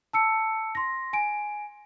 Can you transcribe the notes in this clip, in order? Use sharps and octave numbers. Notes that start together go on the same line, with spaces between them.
A5 E6 C#7
C6 A#6
G#5 D7